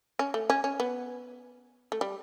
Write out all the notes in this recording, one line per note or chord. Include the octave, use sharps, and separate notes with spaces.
C#4
A3
C#4
C#4
B3
A3
G3